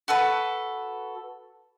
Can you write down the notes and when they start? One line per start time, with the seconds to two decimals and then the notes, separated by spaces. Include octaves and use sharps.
0.08 F#4 A4 B4